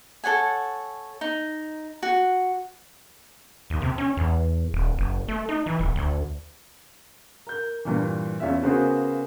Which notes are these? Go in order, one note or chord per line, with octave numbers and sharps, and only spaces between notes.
A4 C#5 F#5 G#5
D#4
F#4
D#2
C3
C#4
E2
D#1
F#1
A3
D#4
E3
D#1
D2
A#4 G6
G2 A#2 E3
E2 C#4 F4 E5
C#3 A#3 B3 F#4 G#4 C5